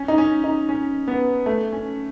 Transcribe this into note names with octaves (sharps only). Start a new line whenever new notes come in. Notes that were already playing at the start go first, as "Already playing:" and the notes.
Already playing: C#4
D#4
C#4
D#4
C#4
B3
A3
C#4